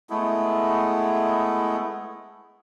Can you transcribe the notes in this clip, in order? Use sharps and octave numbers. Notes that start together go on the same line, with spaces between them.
G#3 A3 B3 E4